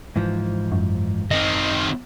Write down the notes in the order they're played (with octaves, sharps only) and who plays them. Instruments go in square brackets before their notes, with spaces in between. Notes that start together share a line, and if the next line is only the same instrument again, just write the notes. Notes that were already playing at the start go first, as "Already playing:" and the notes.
[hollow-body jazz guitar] G#2 E3 F3
[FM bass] F#2
[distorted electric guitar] D#3 C4 [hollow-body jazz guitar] D#5